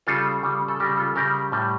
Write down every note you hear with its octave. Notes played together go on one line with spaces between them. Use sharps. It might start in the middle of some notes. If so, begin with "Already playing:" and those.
C#3 G3 F4 A4
C#3 G3
A4
C#3 G3 G4 A#4
F4 A4
C#3 G3 G4 A#4
A2 G3